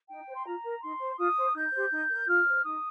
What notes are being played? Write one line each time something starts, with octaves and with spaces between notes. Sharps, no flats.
D#4 G5
C5
C6
F4 A#5
A#4
D#4 C6
C5
F4 D#6
C5
D#4 G6
G4 C5
D#4
A#4
F4 F6
C5
D#4 D#6